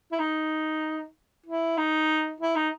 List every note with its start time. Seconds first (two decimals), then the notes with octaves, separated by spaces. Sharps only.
0.12 E4
0.20 D#4
1.46 E4
1.78 D#4
2.41 E4
2.56 D#4